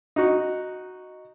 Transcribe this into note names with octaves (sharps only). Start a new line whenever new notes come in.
D#4 F#4